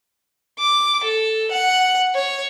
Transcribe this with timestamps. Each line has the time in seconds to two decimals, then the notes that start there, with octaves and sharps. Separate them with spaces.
0.59 D6
1.04 A4
1.51 F#5
2.15 C#5